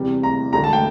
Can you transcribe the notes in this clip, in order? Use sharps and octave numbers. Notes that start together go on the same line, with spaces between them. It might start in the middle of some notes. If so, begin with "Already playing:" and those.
Already playing: E2 C3 G3
A#5
E1 D2 D3 A3 D4 A#5
A5
G5